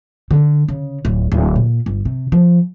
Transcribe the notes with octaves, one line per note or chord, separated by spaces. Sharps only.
D3
C#3
D1
D1
A#2
G1
C3
F3